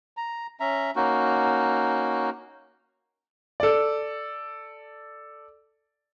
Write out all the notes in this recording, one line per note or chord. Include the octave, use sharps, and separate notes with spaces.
A#5
C#4 E5 A#5
A#3 C#4 D#4 F#4
A4 D5